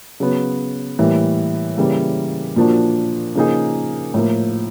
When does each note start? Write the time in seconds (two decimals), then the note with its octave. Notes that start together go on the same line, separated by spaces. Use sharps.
0.20 C#3 F#3 B3
0.99 A2 E3 G3 A#3
1.78 C#3 E3 G3 A#3
2.56 A#2 F3 A#3 D4 F#4
3.35 C#3 F3 A#3 D#4 G#4
4.14 A2 F3 A#3